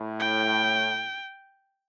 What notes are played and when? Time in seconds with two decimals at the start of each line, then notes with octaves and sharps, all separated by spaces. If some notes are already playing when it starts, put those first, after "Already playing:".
Already playing: A2
0.20 G5